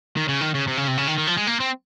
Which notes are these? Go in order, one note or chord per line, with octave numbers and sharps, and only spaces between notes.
D#3
C#3
D#3
C#3
C3
C#3
C3
C#3
D#3
D#3
F3
G#3
A#3
C4